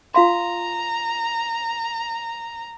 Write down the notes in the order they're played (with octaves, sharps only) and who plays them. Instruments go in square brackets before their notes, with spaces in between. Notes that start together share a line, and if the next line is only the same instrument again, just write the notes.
[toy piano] F4 F5 C6 [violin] A#5